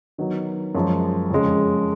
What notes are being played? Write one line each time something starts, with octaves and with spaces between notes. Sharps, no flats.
D#3 F#3 B3 D#4 F#4
F#2 F3 G#3
F2 C#3 G#3